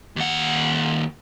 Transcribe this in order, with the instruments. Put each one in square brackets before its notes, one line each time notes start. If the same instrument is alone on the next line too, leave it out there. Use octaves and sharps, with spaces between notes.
[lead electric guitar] D#2 F#5